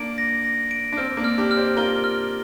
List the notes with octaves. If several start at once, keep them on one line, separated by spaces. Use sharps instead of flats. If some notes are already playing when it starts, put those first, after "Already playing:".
Already playing: A#3 D4 D7
A#6
A#6
D7
D4
C4 F6
A#3 D4
F6
D4 G4
F6
G4 C5
F4 A#4 G7
F6